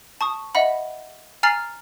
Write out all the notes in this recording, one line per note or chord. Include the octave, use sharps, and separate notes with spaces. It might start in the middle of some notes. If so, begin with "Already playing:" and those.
A5 C#6 D#6
D#5 E5 F#5 B5
G#5 A#5 F6 A6 C7 F#7